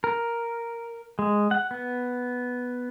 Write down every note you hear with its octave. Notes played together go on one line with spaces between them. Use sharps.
A#4
G#3
F#5
B3